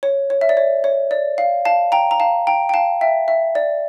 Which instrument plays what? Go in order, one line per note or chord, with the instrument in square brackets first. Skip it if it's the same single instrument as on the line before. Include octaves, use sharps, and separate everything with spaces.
[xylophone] C#5
C#5
E5
D5
C#5
C#5
D5
F5
F5 A5
G5 A#5
A#5
F5 A5
G5 A#5
G5
F5 A5
E5 G5
E5
D5